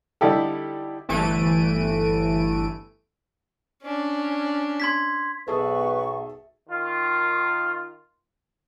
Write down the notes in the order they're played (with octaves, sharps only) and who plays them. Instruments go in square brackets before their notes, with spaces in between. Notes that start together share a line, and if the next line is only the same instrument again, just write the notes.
[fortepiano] D3 G3 D#4 E4 G4 A4
[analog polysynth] G1 E3 A3 D7 D#7
[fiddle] C#4 D4
[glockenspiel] C6 G#6 B6
[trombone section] B1 [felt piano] G#4 A4 E5 [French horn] B4 [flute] C#6
[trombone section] D#3 F4